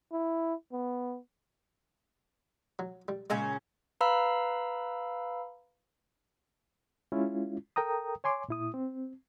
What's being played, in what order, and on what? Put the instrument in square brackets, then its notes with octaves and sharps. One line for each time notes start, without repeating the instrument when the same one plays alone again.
[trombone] E4
B3
[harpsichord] F#3
G3
[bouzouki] A#2 C#3 C#4 [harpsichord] G#3 E5 F5
[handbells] B4 F5 A#5 B5 E6
[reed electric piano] G#3 C#4 E4 F4
A4 A#4 G5 A#5 D#6
C#5 G#5 C6 D6
A#2 E4 D#6
C4